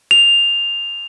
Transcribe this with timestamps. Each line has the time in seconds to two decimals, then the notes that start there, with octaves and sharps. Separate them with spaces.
0.11 F7